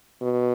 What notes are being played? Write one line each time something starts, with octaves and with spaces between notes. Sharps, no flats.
B2